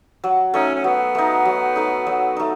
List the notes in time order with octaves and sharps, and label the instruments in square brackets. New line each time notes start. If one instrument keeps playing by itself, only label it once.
[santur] F#3
[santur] A3 D#4 [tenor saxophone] C#4
[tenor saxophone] C#4
[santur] F#3 [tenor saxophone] B3
[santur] A3 D#4
F#3
A3 D#4
F#3
A3 D#4